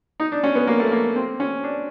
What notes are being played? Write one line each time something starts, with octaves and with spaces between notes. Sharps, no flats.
D#4
D4
C#4
B3
A#3
A3
A#3
C4
C#4
D4